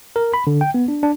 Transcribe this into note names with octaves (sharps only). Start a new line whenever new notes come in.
A#4
B5
D3
G5
B3
D4
D4